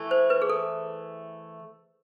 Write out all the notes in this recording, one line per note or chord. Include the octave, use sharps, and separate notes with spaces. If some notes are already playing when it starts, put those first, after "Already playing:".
Already playing: E3 A3
C5
B4
G#4
A4